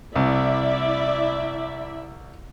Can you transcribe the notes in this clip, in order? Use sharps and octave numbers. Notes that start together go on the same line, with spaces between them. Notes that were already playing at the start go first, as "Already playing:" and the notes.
C2 E4 D5 E5